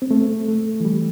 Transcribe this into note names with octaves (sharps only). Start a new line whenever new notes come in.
C4
A3
A3
E3
G3